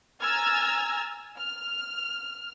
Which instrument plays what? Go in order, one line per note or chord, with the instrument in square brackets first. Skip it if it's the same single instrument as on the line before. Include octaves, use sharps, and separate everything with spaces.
[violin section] G#5 A#5 E6 F6 G#6 A6
F6